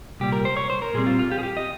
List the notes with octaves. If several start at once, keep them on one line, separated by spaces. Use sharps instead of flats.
C2 A#2 G3 G4
A#4
C5
C#5
C5
A#4
A#2 G3 C4 G#4
F4
F4
G4
G#4
G4
D#5